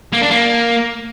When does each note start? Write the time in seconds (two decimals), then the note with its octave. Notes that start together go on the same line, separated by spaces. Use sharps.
0.13 A#3
0.22 D4
0.30 A#3